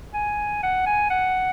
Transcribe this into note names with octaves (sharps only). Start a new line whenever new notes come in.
G#5
F#5
G#5
F#5